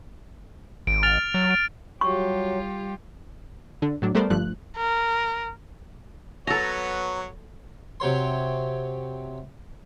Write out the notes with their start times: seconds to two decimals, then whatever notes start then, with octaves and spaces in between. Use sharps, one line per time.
0.87 G#1 D7
1.03 F6 A6 F7
1.34 F#3
1.51 D7
2.01 F#3 G3 F4 G4 C#6
3.82 D3
4.02 A2 F#3 D4
4.15 G3 A3 B3 A#4 C5 D5
4.30 G1 G2 F3 A3 F#6
4.77 A#4
6.47 F#3 B3 A4 C#5 A#5
8.00 C3 F#3 C#5 C6